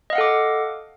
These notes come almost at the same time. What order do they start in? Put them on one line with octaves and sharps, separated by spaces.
D#5 F5 F#5 A4 D6